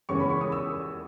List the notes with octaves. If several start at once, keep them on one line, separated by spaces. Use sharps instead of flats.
E2 C#3 G#3 C#4 C#6
B5
C#6
D#6
E6